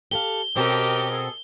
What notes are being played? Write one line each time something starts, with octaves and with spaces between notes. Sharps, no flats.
G4 A4 F5 G7
B2 C4 C#4 G4 A4 A#4 D#5
G#4 A4